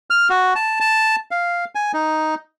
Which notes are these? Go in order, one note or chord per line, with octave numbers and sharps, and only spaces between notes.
F6
F#4
A5
A5
F5
G#5
D#4